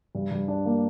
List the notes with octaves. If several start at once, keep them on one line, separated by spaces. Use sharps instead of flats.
G2
G2
D4
A#3